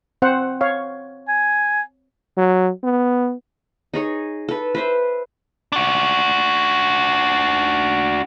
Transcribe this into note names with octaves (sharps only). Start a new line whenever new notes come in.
C4 C5 F#5
C#5 F5
G#5
F#3
B3
D#4 G#4 C#5
A4 B4
B4 C5 E5
D4 F#4